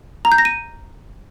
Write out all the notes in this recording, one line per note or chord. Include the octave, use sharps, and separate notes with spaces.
A#5
G6
A#6
D#7